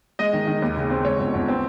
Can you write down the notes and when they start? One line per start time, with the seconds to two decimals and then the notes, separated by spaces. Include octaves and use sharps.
0.19 G#3 D#5
0.33 D#3
0.47 D#3
0.62 D#2
0.76 C#3
0.90 C4
1.05 G#3 C#5
1.19 G1
1.34 G1
1.48 C4